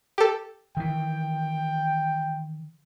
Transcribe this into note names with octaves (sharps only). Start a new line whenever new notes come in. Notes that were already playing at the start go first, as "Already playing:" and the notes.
G4 A4
D#3 E3 G5